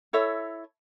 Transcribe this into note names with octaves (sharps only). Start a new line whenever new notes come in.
E4 A4 C#5 E5